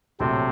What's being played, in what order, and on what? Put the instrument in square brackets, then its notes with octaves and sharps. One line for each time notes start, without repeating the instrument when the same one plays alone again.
[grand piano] A#1 A2 F#3 A3 [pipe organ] C3 C4